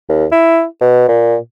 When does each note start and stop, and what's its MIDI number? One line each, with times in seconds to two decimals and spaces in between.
0.09 0.25 39
0.32 0.64 64
0.81 1.07 47
1.08 1.37 46